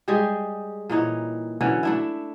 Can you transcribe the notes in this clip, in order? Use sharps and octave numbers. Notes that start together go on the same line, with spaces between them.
G3 G#3 G4 G#4
A#2 E3 D#4 C#5
D3 E3 F#3 C#4
A3 D4 E4